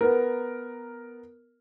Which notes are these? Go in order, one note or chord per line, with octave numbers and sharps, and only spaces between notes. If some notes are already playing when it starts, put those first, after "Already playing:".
B3 A#4